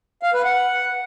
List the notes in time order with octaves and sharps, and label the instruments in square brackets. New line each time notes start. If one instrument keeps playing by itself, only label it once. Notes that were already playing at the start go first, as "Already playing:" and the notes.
[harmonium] F5
B4
F#5